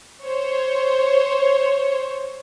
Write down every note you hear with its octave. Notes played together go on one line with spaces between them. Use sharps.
C5 C#5